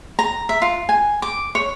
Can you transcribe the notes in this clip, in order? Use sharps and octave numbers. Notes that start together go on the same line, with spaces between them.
A#5
E5
F4
G#5
D6
C#5